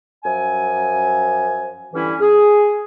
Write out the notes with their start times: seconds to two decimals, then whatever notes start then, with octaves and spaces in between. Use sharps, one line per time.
0.24 F#2 F3 G#5
1.94 G2 D3 E3 C#4 E4
2.20 G#4